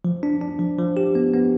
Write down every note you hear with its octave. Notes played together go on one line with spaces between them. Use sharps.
F3
D4
D4
F3
F3
G4
B3
B3